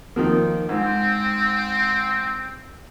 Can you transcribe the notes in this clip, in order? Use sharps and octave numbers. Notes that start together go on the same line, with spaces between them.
D#3 F3 A#3
G#2 C4